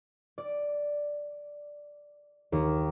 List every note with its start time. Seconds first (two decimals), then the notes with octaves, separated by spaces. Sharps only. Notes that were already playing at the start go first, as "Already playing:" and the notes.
0.38 D5
2.52 D#2